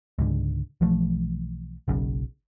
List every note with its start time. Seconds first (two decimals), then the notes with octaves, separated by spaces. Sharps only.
0.19 C#2 G#2 D3
0.81 B1 E3 F3 A3
1.88 F#1 B1 F#2 C#3